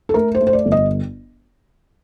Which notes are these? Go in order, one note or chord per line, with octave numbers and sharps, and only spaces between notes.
A4
A3 A#4
C5
A3
C5
D5
G1
D#5